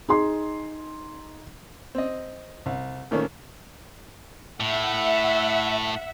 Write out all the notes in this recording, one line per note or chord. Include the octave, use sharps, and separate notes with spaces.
D#4 G#4 C6
C4 D#5
C2
A#2 D#3 F3 A3 A#3 C#4
A2 E5 F#5